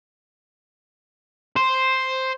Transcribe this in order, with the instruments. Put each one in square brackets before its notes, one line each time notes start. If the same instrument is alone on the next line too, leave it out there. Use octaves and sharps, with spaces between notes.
[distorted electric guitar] C5